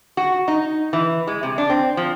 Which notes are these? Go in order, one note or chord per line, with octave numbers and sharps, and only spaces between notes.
F#4
D#4
E3
G#3
C3
D4
C4
F3